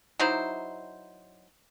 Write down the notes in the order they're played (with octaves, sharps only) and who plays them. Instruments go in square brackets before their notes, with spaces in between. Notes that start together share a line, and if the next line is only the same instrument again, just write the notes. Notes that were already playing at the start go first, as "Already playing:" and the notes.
[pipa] F#3 D#4 E4 C5